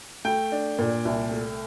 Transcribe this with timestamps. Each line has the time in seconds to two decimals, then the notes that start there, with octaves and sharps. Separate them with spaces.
0.25 A3 G5
0.52 D4
0.79 A#2
1.05 C2
1.31 A3